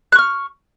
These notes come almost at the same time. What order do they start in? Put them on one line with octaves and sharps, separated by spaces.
F#6 C#6 F6